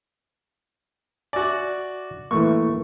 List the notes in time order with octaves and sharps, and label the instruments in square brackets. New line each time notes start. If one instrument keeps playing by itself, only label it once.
[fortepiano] F#4 D5 [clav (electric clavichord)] E5 G#5
[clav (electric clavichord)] E3 A3 A#3 [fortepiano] C#6